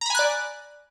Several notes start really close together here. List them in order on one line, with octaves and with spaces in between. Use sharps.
A#5 B5 G#5 F#6 D5